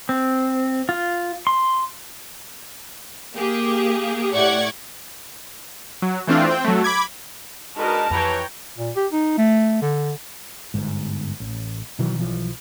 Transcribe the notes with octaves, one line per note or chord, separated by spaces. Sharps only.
C4
F4
C6
A#3 G4 G#4
A2 G4 D5 F#5 C#6 G#6
F#3
E3 A3 C4 D4 F4
C4 G5
F#3 A3
B5 D6 G#6
G#3 D4 D#4 F#4 A#4 B4 A5
F2 E3 G4 B4 C#5 G5 A#5
A#2
G4
D#4
A3
D3
G1 G#2
A1
B2 D#3 E3 F#3
B1 E3 F3